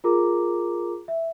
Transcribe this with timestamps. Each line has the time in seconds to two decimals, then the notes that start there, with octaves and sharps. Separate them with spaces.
0.04 F4 G#4 A#4 A#5 D6
1.08 E5